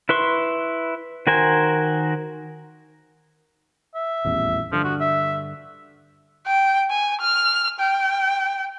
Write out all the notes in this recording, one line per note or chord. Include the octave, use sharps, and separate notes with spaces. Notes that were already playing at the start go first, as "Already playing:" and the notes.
E4 B4 C6 C#6
D#3 F#4 A#4 C5 G#5
E5
D#1 A1 E2
G2 D3 F3
F#4
E5
G5
G#5
F6
G5